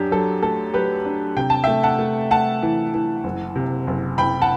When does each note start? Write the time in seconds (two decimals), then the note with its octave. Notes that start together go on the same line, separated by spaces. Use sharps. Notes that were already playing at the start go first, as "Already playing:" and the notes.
Already playing: F#2 D4 G4
0.11 F#3 A4
0.42 A3 A4
0.74 F#3 G4 B4
1.05 D4
1.37 C3 G5
1.50 A5
1.64 A3 E5 G5
1.83 F#5 A5
1.99 A3
2.31 A3 F#5 A5
2.63 E3
2.94 E3
3.24 F#1
3.55 C3
3.87 F#1
4.18 F#1 G5 B5
4.42 F#5 A5